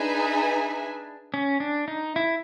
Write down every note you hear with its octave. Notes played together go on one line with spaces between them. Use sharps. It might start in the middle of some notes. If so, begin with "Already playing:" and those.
Already playing: D4 D#4 G#4 B4 E5 G#5
C#4
D4
D#4
E4